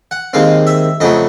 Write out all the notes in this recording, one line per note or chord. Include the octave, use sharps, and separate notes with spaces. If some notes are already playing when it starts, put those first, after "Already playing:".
F#5
D#2 D#3 G#3 C4 F5
E5
F2 C#3 F#3 A3 D#5